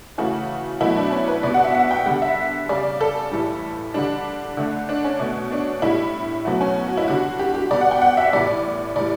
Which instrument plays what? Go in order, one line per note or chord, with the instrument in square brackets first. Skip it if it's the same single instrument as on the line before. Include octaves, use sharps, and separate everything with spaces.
[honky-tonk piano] C#3 E3 A3 F#4
B2 F#3 A3 E4
D4
C#4
B4
B2 G3 D5
F#5
E5
F#5
G5
D3 G3 F#5
E5
C#3 G3 D5
A4
A2 E3 G3
D3 G3 D4
D3 A3
D4
C#4
B2 A3
D4
A2 G3 E4
B2 F#3 A3 F#4
C#4
F#4
E4
D3 G3 F#4
G4
G4
B2 G3 D5
F#5
G5
F#5
E5
A2 E3 G3 D5
A2 E3 G3 D5